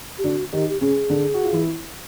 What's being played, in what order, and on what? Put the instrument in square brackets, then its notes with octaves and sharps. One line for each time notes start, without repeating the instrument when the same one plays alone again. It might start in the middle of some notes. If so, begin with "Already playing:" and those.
[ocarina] G4
[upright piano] D3 D4 [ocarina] F#4
[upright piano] D#3 D#4 [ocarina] G4
[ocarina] G4
[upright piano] C#3 C#4 [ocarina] G#4
[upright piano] D3 D4
F#4
F4
E3 E4